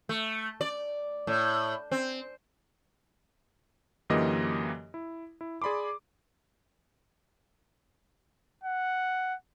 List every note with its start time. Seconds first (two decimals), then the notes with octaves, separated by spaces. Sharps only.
0.09 A3
0.61 D5
1.27 A2
1.91 C4
4.10 F#2 D3 E3 A#3 G4 D#5
4.94 E4
5.41 E4
5.62 G#4 D5 B5 C6 D6
8.64 F#5